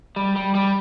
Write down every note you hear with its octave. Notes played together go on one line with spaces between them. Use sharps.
G3
G3
G3